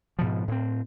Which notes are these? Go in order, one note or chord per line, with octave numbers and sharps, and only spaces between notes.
G#2 B2 F3
A2 C4